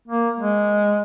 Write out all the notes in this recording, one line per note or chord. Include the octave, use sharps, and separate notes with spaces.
A#3
G#3